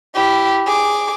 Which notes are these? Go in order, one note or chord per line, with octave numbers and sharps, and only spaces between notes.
E4 G4
G#4 D6